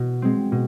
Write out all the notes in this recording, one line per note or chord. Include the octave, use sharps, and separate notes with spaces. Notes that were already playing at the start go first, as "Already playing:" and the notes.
Already playing: B2
G#3 C4
B2